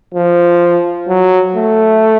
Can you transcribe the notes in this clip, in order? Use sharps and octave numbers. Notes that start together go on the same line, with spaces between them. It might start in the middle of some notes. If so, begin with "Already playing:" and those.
F3
F#3
A3